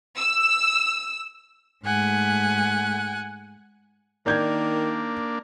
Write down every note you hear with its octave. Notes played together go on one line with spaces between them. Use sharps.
E6
G#2 A3 F#5 G#5
D#3 A#3 D4 D5 G6 G#6